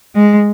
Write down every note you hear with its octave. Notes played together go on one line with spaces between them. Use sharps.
G#3